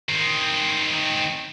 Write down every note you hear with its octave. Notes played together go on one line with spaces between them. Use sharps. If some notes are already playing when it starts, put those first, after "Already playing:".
D#3 C4